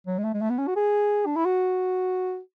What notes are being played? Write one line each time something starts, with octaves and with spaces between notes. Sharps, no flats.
F#3
G#3
A3
G#3
A3
B3
C#4
F#4
G#4
D4
E4
F#4